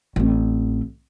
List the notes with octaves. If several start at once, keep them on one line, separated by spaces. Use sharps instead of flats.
A1 C4